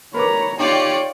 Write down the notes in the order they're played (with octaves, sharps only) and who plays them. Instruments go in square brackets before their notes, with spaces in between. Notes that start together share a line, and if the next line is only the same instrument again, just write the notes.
[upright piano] A#4 B4 D6 [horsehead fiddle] C#5 A#5 [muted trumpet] B5
[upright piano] D#4 [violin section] F4 D5 C#7 [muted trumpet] G4 [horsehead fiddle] C#5 G5